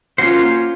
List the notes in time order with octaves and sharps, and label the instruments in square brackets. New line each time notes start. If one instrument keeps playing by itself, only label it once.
[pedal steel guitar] A#3 C#4 F#4 C5 [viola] F4